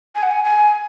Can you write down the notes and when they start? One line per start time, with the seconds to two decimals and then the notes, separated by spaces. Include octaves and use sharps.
0.15 G#5
0.23 F#5
0.31 G#5
0.45 G#5